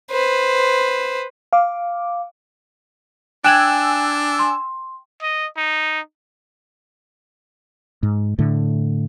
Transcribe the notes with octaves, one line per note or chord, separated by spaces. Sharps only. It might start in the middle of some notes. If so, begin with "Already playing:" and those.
B4 C5
F5 D6
D4 G5 G#5 E6 F#6 G#6 E7 F#7
C6
D#5
D#4
G#2
A2 D3 A3